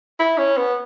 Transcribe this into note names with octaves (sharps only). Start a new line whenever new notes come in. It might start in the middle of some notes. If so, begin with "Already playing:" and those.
E4
C#4
B3